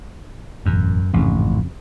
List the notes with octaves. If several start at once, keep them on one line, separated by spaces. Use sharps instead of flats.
E1 A1 F#2
A1 F2 G#2 C#3